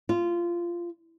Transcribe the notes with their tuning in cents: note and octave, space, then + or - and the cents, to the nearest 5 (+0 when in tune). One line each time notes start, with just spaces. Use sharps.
F4 -15